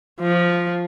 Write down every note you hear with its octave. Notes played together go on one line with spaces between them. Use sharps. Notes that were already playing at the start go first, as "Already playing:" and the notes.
F3